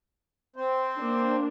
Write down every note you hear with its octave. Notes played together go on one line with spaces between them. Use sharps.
C4 C5
A#3 D4